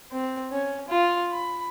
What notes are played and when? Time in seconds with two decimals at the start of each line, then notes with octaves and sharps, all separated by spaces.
0.11 C4
0.51 C#4
0.88 F4
1.32 B5